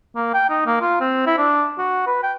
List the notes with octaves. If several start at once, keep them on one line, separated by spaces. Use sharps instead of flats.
A#3
G5
D#4
A#3
F4
C4
E4
D4
F#4
B4
G5